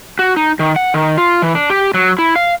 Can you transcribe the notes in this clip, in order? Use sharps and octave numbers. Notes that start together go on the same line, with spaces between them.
F#4
D#4
D#3
F#5
D#3
F4
E3
D4
G4
F#3
E4
F5